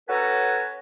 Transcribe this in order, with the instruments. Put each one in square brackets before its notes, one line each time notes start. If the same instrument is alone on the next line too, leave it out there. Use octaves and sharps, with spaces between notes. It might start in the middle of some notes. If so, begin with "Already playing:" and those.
[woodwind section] C#4 F#4 A4 B4 G#5 A#5